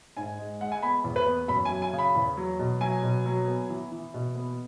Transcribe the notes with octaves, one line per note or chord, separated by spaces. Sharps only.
G#2 G#5
G#3
G#3 F#5
G#5
B3 B5
E2
B4
B3
F#2 B5
G#5
F#3
G#5
C#3
B5
E2
F#3
B2
F#3 G#5
B2
F#3
B3
E3
E3
B2
B3